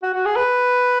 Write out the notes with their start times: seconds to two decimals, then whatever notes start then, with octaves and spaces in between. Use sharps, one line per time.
0.02 F#4
0.14 F#4
0.25 G#4
0.36 B4